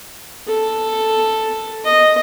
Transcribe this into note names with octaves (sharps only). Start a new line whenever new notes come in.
A4
D#5